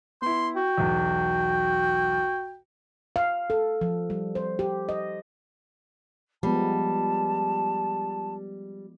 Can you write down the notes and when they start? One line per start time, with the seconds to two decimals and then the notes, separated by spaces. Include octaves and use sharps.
0.22 B3 E4 C6
0.56 F#4 G5
0.78 B1 E2
3.16 F5
3.50 A4
3.81 F3
4.10 G3
4.35 C5
4.59 G4
4.89 D#5
6.43 F3 G3 G#3 B3 A5